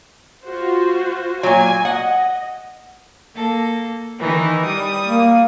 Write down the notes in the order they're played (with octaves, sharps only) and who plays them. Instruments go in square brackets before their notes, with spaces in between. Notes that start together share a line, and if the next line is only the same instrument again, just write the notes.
[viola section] F4 F#4 C5
[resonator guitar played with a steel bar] A#2 F#3 [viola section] G#5
[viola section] D#5 [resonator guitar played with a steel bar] F#5
[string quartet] A#3 A4
D#3 E3 D#4
G3 D#6
[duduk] A#3